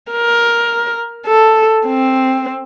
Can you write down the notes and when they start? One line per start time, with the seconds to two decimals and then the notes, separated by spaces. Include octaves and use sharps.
0.12 A#4
1.26 A4
1.87 C4